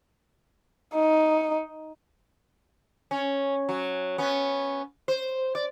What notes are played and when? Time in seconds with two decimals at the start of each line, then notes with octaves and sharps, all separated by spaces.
0.95 D#4
3.11 C#4
3.69 F#3
4.18 B3 C#4
5.08 C5
5.55 D5